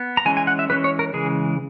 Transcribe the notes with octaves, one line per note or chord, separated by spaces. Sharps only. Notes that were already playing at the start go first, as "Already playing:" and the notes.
Already playing: B3
A#5
E3 G#3 C#4 G#5
G#5
F#5
E5
E3 G#3 C#4 B4
C#5
A#4
C#3 E3 G#3 G#4